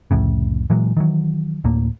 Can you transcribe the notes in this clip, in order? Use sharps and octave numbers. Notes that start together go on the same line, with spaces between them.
C2 F2 A2 C#3
A#2 E3 F#3 G#3
D#3 E3 F#3
D1 D2 A2 A#3